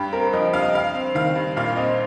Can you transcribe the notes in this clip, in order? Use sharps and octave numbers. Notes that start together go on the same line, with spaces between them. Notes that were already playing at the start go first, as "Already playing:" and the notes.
Already playing: G2 G4
C4 A#4
F3 D#5
G2 F5
D#5
G2 F5
C4
D#3 F5
G2
A#2 F5
C4 D#5